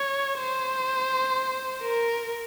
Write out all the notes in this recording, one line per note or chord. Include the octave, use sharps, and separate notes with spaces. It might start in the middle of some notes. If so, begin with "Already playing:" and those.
Already playing: C#5
C5
A#4